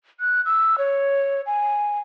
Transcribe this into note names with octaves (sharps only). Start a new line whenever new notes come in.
F#6
E6
C#5
G#5